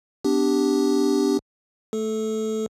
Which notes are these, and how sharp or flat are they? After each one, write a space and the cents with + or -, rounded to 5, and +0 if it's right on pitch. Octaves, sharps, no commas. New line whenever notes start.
B3 +30 D4 +0 G4 +0
A3 +0 A4 -15